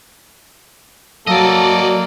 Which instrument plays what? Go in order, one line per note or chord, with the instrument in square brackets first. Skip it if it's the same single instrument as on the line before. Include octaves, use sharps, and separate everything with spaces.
[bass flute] F#3 [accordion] A#3 [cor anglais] A4 [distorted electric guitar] D5 D#5